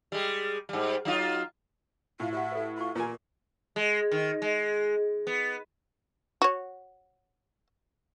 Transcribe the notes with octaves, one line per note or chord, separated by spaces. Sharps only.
G3 G#3
G#2 G3
F#3 D#4 F4
A2 F4
F#4 G4 E5 F#5
A4 B4
F4 C6 C#6
A#2 A#4 B4 G#5
G#3
D#3
G#3
B3
F#4 C#5